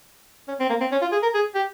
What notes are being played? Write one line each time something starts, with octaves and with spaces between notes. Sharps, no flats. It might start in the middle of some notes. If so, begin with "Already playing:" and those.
C#4
C4
A#3
C4
C#4
F4
G#4
A#4
G#4
G4